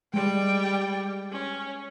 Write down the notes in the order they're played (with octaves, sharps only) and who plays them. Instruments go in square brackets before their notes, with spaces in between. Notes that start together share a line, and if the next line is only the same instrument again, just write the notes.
[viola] G3 G5 [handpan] G#3
[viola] C#4